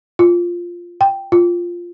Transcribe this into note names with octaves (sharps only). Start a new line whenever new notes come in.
F4
G5
F4